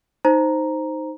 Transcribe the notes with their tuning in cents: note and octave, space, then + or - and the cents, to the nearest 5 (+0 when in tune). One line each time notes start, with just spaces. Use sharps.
D#4 +0 C5 +0 A#5 +0